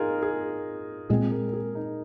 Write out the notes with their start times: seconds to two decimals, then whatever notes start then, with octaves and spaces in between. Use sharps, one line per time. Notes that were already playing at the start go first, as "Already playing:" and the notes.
Already playing: D#4 F4 G#4 A#4
0.23 G#4
1.10 A#2 G#3 C4 G#4
1.31 A#4
1.48 A#4
1.53 G#4
1.75 D#4